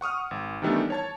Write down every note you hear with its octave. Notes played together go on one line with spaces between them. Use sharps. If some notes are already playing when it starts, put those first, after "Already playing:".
F#5 C#6 D#6 F6
G#1
D#3 E3 G3 A3 B3 D4
C#5 A5 G#6